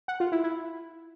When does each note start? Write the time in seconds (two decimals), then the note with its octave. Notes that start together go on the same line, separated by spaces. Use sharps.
0.08 F#5
0.20 F4
0.32 E4
0.44 E4